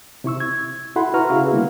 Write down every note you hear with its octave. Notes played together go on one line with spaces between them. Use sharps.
C3 E4 C#6 E6
G#6
E4 F#4 A4 F#5 B5 C6
E4 F#4 B4 A#5 C#6 F6
C#3 C#4 E4 F#4 G#4 F5
D3 G3 A#3 B3 E4